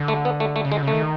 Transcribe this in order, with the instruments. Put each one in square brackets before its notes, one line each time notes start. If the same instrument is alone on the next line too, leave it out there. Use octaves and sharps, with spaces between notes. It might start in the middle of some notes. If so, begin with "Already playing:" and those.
Already playing: [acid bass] D3
[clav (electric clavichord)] A3
B3
A3
A3
[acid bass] C#3
[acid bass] D3 [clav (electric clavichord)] G#3
[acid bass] C#3
[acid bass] D#3 [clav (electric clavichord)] A3